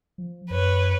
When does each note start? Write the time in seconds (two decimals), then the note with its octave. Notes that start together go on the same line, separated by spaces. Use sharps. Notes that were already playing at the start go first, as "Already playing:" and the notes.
0.18 F3
0.50 F#2 B4 C#5